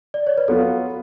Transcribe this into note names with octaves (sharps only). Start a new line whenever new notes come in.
D5
C#5
B4
F#3 B3 F4 A4